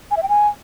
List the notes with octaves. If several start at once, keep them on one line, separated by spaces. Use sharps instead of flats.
G#5
E5
G5
G#5